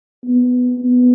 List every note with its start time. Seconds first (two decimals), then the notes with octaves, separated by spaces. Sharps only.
0.25 B3
0.79 B3